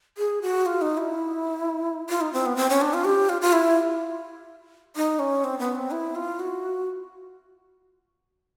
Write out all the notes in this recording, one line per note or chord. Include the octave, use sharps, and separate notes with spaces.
G#4
F#4
F4
D#4
E4
F4
D#4
C4
B3
C4
C#4
D4
F4
G4
F4
F4
E4
D#4
C#4
C4
B3
C4
E4
F4
F#4